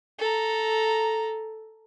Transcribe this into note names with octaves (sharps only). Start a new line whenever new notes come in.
A4 A#5